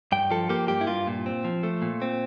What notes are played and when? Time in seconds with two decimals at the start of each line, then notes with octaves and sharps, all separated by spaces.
0.12 G2 G5
0.31 F3 A4
0.49 A#3 G4
0.68 G2 G4
0.81 E4
0.87 G2 F4
1.07 A#2
1.26 C4
1.45 F3
1.63 A3
1.82 A#2
2.02 C4